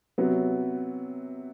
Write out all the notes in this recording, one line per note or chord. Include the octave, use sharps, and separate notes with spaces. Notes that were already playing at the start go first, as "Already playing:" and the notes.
C3 F#3 B3 F#4